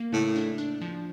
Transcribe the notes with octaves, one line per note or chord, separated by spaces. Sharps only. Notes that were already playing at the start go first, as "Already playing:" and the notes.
Already playing: A#3
A2 C#3
D4
D4
F3